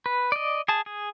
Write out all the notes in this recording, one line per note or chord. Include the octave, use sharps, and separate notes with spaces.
B4
D5 D#5
G#4 A5
G#4